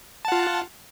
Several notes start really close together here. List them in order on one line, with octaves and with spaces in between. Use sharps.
A5 F#5 F4